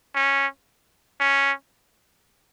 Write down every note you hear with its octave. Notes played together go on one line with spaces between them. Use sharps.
C#4
C#4